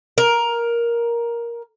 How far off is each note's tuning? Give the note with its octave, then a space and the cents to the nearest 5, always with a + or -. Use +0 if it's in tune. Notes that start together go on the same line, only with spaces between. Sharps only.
A#4 +10